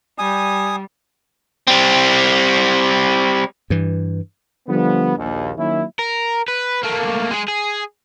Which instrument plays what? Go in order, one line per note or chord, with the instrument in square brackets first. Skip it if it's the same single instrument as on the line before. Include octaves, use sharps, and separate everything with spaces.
[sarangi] G3 [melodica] G#5 D#6
[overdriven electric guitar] G3 C4
[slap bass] G2 E3
[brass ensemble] D3 F3 G3 B3
A#1 D#2
D#3 F#3 A#3 C#4 E4
[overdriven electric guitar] A#4
B4
A3 A#3
G#3 G#4
G#4